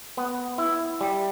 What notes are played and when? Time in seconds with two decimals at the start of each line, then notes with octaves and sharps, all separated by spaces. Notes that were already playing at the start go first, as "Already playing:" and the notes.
0.17 B3
0.58 E4
1.01 G3